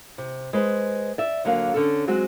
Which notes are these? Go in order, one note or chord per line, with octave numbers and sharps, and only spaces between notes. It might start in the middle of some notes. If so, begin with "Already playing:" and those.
C3
G#3 B4 C5
D5 E5
D#2 D3 F#3 A#3 B4 F5
D3 C#4 A4
F#3 G#3 C4 F#4